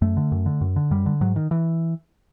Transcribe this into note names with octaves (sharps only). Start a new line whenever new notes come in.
F#2 A3
D3
F#2
D3
F#2
D3
F#2 G3
D3
G#2 F#3
D#3
E3